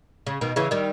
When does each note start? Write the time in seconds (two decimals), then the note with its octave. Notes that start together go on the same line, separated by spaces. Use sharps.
0.27 C#3
0.41 B2 D#3
0.56 C#3 E3
0.71 D#3 G3